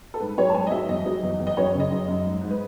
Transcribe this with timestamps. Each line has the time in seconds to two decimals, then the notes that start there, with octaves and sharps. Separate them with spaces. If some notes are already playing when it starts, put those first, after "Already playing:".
0.14 A4
0.20 G#2 B4
0.37 F#3 C#5
0.50 A5
0.54 G#2 G#5
0.67 D#5
0.71 F#3 E5
0.89 E2 D#5
1.06 F#3
1.23 E2
1.39 E2
1.47 D#5
1.57 F#2 C#5
1.74 C#3
1.80 D#5
1.91 F#2
2.08 F#2
2.25 G#2
2.42 G#2
2.50 B4